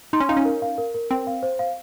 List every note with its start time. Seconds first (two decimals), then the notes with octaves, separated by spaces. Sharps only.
0.13 D#4 C6
0.20 C#4
0.29 D#4 F5
0.37 C#4
0.45 A#4
0.62 F5
0.78 A#4
0.94 A#4
1.10 C4 A#4
1.27 F5
1.43 C5
1.59 F5